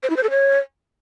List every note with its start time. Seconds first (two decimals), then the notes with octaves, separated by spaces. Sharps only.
0.03 C5
0.10 E4
0.17 C5
0.23 A4
0.30 C#5